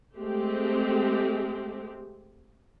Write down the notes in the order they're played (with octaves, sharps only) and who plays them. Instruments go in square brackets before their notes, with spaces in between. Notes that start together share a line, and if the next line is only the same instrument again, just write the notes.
[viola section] G#3 A3 C4 G4